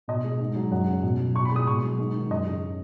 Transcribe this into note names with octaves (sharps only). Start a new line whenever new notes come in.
B2 D#5
G#3
G#2
F#3
F#2 F#5
C#3
B2
F#3
B2 C#6
B5
G#3 D#6
B2 C#6
F#3
G#2
D#3
F#2 D#5
C#3